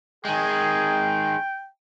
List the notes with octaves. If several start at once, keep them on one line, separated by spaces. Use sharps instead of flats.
D#3 G#3 G#4 G5